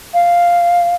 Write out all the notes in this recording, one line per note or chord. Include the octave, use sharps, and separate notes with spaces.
F5